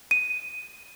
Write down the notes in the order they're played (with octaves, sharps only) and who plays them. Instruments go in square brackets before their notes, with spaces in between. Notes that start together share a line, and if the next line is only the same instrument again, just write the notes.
[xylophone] D#7